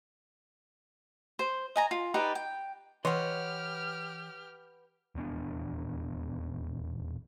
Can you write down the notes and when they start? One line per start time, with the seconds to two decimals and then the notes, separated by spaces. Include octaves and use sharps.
1.39 C5
1.76 D#5 G#5 A#5
1.91 F4
2.14 D#4 G4 B4 D5
2.35 G5
3.05 E3 G4 B4 C#5 D#5 F#5 C6 F6
5.15 D#1 E2 B3 D4